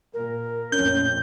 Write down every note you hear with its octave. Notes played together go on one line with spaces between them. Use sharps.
A#2 A#4
A#1 F2 A2 C#4 G6